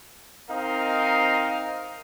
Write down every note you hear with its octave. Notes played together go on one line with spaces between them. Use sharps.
C4 D#4 A#4 D#5 F5 D#6